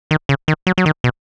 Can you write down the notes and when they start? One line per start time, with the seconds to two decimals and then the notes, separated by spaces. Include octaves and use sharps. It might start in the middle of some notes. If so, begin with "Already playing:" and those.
0.11 D#3
0.29 C#3
0.48 D#3
0.67 F#3
0.78 F#3
0.86 D#3
1.04 B2